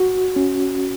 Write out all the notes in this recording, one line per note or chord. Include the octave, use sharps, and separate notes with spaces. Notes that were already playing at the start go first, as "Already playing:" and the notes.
Already playing: F#4
C#4